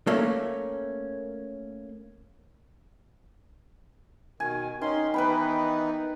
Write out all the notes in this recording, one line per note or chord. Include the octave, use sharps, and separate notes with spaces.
A3 A#3 C#4
B2 D#3 G#5
D#3 C#4 D#4 C6
E3 B3 D#4 B4 G5 B5